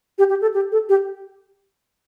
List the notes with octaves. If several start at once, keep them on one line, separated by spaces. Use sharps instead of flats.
G4
G4
A4
G4
A4
G4